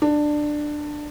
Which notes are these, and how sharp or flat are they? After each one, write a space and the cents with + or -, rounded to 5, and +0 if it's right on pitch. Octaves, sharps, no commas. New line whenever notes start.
D4 +15